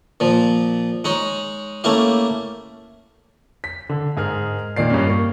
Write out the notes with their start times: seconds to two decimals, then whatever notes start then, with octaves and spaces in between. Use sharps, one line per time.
0.20 A#2 F3
1.04 G#3 D#4 C#5
1.84 A3 A#3 C#4 E4 G4
3.64 B6
3.89 D3
4.17 G#2 G#4 A#4 F6
4.76 A#2 D#3 D5 C7
4.90 G2 C#4
5.07 A#3 C#6